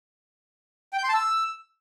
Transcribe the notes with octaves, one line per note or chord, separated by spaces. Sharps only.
G5
G6
C6
A5
E6